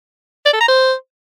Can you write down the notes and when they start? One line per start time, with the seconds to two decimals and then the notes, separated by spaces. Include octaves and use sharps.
0.46 D5
0.53 A4
0.61 A#5
0.68 C5